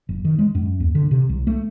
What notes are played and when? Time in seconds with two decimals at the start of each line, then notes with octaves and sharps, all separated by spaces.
0.09 F#1
0.25 D#3
0.39 G#3
0.55 F#2
0.80 D#2
0.95 D3
1.11 C3
1.29 C2
1.47 A3